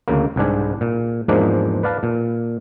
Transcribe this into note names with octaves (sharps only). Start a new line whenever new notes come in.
D2 C#3 A#3
C2 G#2 D4 G#5
A#2
E2 G#2 F3 G#3 A#3 D4
B4 D5 F5 A5
A#2